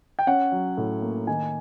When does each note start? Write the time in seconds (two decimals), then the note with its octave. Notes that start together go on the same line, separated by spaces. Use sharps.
0.19 G5
0.27 C#4 F#5
0.52 F#3
0.78 A2
1.02 A#3
1.27 D#3 G#5